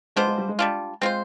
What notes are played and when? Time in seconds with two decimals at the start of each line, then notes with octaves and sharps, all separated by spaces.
0.16 G#3 B3 D4 F4 C5
0.27 G#3
0.38 G3
0.48 G#3
0.59 G3 D4 F4
1.01 G#3 C4 F4 C5